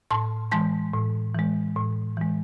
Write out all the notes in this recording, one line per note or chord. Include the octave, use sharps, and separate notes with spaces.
A2 A5 C6
E3 G#3 A5 C6
A2
E3 G#3
A2
E3 G#3